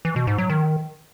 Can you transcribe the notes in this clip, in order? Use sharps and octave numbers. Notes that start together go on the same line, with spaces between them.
E3
B2
G#2
F#3
D#3